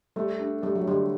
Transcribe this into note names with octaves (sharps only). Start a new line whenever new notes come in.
G3 A3
D4
G3 A3
F#3
D3 G3